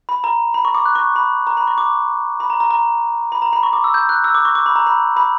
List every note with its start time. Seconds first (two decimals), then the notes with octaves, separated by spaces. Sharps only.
0.09 B5
0.24 A#5
0.54 B5
0.65 C#6
0.75 D6
0.86 F#6
0.95 C#6
1.16 B5
1.47 A#5
1.57 B5
1.67 C#6
1.78 D6
2.40 B5
2.50 A#5
2.60 A#5
2.71 A#5
3.32 B5
3.42 A#5
3.53 B5
3.63 C#6
3.73 D6
3.84 E6
3.94 G6
4.09 F#6
4.24 E6
4.35 D6
4.45 C#6
4.55 D6
4.66 B5
4.76 A#5
4.87 B5
5.17 B5